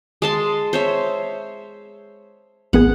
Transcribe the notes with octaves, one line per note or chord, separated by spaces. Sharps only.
G#3 A5 C6
C5 C#5 E5
A1 B3 G#4 F#5